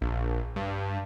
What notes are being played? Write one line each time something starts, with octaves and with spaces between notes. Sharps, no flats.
A#1
G2